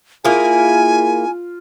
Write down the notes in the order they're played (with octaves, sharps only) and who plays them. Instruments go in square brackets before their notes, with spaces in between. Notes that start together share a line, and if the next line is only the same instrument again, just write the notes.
[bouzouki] A#3 E4 G#4 [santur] F4 [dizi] G#5